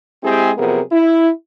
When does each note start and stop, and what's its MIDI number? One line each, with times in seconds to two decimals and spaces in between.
0.23 0.52 56
0.23 0.52 60
0.23 0.52 64
0.23 0.52 67
0.23 0.52 68
0.57 0.80 48
0.57 0.80 53
0.57 0.80 54
0.57 0.80 59
0.57 0.80 68
0.57 0.80 70
0.92 1.29 64